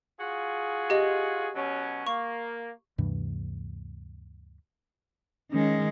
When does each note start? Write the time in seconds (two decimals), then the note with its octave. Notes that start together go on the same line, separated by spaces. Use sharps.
0.19 F4 F#4 G#4
0.90 G4 D#5
1.55 B2 F#3 C#4
2.07 A#3 C#6
2.98 D2 G2 C3 E3
5.52 D#3 G#3 C#4